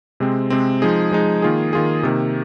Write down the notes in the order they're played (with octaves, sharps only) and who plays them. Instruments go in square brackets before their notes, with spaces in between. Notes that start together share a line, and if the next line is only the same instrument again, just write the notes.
[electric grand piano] C3 G#3 C4
C3 G#3 C4
F3 G#3 D#4 G#4
F3 G#3 D#4 G#4
D#3 A#3 F4 G#4
D#3 A#3 F4 G#4
C3 D#3 A#3